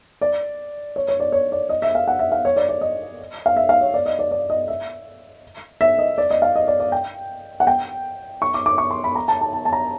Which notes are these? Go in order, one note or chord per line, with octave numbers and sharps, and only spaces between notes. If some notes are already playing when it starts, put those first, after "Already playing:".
D5
C#5
C#5
D5
C#5
D5
D#5
E5
F5
F#5
E5
F5
C#5
D5
D5
D#5
F5
E5
F5
C#5
D5
D#5
D5
D5
D#5
E5
E5
D#5
D5
D#5
F5
D#5
D5
D5
G5
F#5
G5
C#6
D6
D6
C#6
C6
B5
A#5
A5
A5
A5
A5
A#5